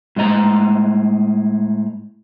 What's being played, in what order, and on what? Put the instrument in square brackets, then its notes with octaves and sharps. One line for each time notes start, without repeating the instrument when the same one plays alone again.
[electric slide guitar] A2 G#3 D#5 A#5